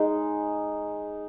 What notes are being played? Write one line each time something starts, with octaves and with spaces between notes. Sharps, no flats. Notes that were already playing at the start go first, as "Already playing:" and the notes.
Already playing: G#3 D#4